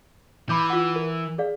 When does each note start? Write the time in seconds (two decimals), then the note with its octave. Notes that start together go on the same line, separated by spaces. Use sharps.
0.49 E3 B5 D6 G6
0.70 F4 F#5
0.96 A#4
1.38 G#4 D5 F5